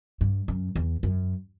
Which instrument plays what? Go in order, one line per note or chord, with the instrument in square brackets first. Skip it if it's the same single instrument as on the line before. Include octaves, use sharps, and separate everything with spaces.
[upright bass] G2
F#2
E2
F#2